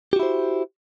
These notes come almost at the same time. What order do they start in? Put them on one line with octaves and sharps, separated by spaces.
G4 F#4 E4 C5